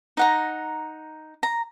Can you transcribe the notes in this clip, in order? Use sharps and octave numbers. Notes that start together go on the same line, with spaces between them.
D#4 F#5 A#5
A#5